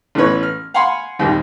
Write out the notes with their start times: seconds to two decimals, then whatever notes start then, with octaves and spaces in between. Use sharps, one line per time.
0.15 A1 E3 B3 B4 C#5
0.43 F6
0.74 F5 F#5 G#5 B5 C6
1.19 D#2 A#2 D#3 G3 C4